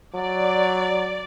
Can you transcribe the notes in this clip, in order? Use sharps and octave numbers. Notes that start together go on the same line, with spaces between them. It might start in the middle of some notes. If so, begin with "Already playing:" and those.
F#3 D5